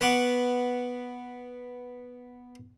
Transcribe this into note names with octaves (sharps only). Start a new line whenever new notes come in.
B3 F#5 C#6 D6